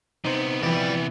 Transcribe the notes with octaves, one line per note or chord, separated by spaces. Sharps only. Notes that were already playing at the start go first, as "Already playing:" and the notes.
C3 B3 D#4 C5
E3 F3 D5 G5